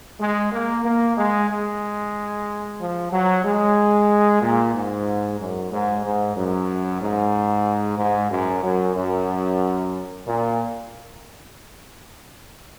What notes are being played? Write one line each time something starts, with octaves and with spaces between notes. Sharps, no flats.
G#3
A#3
A#3
G#3
G#3
F3
F#3
G#3
A#2
G#2
F#2
G#2
G#2
F#2
G#2
G#2
F#2
F#2
F#2
A#2